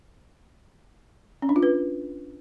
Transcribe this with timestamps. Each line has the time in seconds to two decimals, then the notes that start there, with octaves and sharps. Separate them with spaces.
1.42 C#4
1.49 D4
1.56 F4
1.63 B4